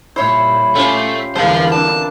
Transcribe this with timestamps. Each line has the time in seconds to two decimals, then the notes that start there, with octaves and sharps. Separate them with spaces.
0.16 A#2 G3 E4 C5 C#5
0.75 A3 C#4 F4 G4 C5
1.36 E2 D3 E3 G3 A4 A#4 C5 F5
1.72 C4 D4 A5